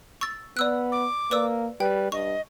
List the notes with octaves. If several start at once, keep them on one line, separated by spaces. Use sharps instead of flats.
C#6 E6 A6
B3 D5 E6 F#6
D6
A#3 B4 D5 E6
G3 B4 G5
G2 D#5 C#6